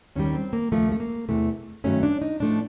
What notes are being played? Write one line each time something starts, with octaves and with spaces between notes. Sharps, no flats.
D#2 D#3 G3 C#4
C4
A#3
D#2 C#3 F3 A3
A3
A#3
E2 C3 E3 A3
G2 D#3 F#3 A3 C#4
D4
D#4
A2 F3 A3 D4